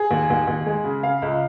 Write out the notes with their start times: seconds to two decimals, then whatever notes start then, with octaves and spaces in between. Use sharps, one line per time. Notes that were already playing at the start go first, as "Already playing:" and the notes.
Already playing: G#4
0.11 D#2
0.30 D#2
0.47 D#2
0.66 G#3
0.84 C#3
1.03 C#3 F5
1.22 C#2